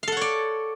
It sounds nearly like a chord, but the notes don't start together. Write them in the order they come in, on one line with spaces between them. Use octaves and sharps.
F5 A4 F#5 C#5 D5